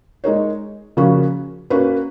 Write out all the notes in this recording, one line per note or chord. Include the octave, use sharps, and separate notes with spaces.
G#3 D#4 A#4 C#5
C#3 F3 A#3 C#4 F#4
A#3 C#4 F#4 B4